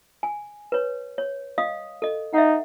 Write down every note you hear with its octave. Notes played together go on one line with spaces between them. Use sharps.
G#5
B4 C#5
C#5
D#5 F5 D#6
A4 D#5
D#4 E5 F#5